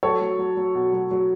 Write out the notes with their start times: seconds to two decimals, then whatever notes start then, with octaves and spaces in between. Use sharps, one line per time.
0.03 F#3 A4 C#5
0.21 F#3
0.39 F#3
0.57 F#3
0.75 B2
0.93 F#3
1.11 F#3